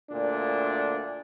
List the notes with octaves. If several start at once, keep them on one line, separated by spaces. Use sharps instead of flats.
D2 A#2 D4